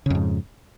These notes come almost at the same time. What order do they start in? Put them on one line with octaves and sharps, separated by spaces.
C#3 F2 G#2